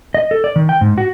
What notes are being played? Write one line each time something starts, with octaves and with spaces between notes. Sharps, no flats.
D#5
A4
D5
D#3
G5
G#2
F#4